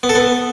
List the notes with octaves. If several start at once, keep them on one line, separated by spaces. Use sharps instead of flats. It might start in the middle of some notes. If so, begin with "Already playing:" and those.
B3
A4
B3